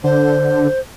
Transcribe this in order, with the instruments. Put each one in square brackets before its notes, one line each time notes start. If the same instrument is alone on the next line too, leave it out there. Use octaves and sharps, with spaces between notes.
[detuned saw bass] D3 [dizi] C5